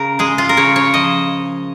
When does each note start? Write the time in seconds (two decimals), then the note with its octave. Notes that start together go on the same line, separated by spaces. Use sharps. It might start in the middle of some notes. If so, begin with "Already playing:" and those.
Already playing: C#3 A#4
0.19 G#3 G#4
0.38 F4
0.49 A#4
0.57 C#3 C#5
0.76 C#5
0.94 F3 D#5